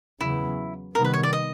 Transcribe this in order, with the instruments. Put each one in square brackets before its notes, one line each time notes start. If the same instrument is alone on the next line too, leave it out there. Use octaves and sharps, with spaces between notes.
[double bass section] E2 C#3 F#3 B3 [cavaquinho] E4
[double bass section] C3 D#3 G3 B3 [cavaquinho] A#4
[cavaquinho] B4
C#5
D5
D#5